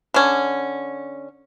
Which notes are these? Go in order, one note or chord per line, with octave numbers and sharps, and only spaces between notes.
D3 C#4